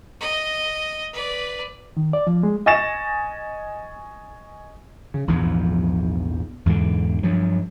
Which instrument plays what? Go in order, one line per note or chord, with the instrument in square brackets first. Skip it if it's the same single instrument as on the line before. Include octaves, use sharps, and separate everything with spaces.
[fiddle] D#5
B4 D5
[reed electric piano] D#3
D5
F3
G#3
[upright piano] D#5 G#5 C#6 A6 A#6 E7
[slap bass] C#3
A#1 E2 G#2 F3
E2 G#2 B2 D3
G2 F3 F#3